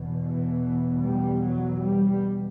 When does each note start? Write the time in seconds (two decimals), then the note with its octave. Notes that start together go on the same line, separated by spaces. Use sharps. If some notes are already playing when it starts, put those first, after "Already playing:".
Already playing: E2 B2
0.22 E3
1.02 G3
1.42 F#3
1.82 G3